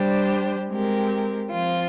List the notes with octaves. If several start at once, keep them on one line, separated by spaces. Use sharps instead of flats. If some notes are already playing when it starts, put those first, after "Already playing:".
Already playing: G3 D4 G4 C5
G#3 C4 G4 A#4
F3 C4 F4